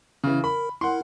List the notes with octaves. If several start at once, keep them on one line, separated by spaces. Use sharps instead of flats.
C#3 E3 C#4
A#4 B5
E4 A#4 F#5 C6